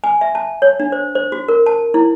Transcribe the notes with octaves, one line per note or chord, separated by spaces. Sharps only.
G#5
E5
A5
C#5
D4
C5
C5
F#4
A#4
A5
E4